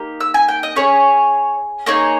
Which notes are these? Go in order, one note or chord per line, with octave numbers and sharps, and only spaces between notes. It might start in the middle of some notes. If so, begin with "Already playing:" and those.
Already playing: A#3 D#4 G4
E6
G#5
G5
D#5
C#4 G#4 C#5
A#3 D#4 G#4 C#5